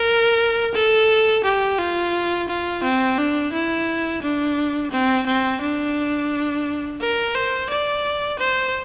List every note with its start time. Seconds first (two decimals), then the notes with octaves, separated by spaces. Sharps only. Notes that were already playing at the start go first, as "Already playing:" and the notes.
Already playing: A#4
0.75 A4
1.44 G4
1.79 F4
2.48 F4
2.83 C4
3.18 D4
3.53 E4
4.23 D4
4.91 C4
5.26 C4
5.61 D4
7.01 A#4
7.35 C5
7.70 D5
8.39 C5